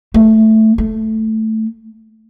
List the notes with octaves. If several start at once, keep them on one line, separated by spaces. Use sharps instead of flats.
A3
A3